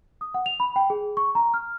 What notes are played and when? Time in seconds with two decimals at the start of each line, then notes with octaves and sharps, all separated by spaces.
0.21 D#6
0.34 F#5
0.46 F7
0.60 B5
0.76 G5
0.90 G#4
1.17 C#6
1.35 A#5
1.54 F6